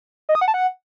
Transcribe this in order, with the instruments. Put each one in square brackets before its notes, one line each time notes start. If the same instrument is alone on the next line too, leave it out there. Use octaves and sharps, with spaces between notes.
[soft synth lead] D#5
D#6
F#5
A5
F#5